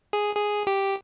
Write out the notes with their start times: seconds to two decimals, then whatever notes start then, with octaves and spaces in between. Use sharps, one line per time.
0.13 G#4
0.35 G#4
0.67 G4